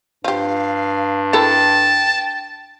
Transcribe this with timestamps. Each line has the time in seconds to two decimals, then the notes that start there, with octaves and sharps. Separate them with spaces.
0.24 G2 F3 G4 F5
1.33 E4 A4 A#4 G5 A5